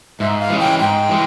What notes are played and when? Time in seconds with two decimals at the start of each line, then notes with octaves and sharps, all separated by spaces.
0.20 G#2 E5
0.40 F5
0.49 E3 G#3 C#4
0.60 G5
0.79 G#2 G5
1.09 E3 G#3